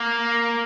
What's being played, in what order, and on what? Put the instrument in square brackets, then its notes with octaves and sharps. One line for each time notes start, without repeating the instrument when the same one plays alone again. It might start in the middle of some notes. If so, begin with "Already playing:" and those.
Already playing: [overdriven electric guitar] A#3